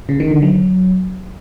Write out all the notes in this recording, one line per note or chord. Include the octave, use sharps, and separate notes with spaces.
C#3
D#3
D3
F#3